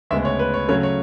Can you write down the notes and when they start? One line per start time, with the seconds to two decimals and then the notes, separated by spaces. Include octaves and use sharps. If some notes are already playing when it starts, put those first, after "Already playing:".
0.11 D2 C#3 G#3 B3 E5
0.25 C#5
0.39 B4
0.54 C#5
0.68 C#3 F#3 A3 C#4 C#5
0.83 C#5